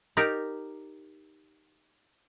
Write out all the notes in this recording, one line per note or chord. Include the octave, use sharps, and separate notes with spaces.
D#4 G4 A#4 D5